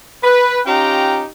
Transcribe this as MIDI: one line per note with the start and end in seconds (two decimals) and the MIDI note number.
0.24 0.60 71
0.66 1.25 61
0.66 1.25 63
0.66 1.25 65
0.66 1.25 67
0.66 1.25 79
0.66 1.25 82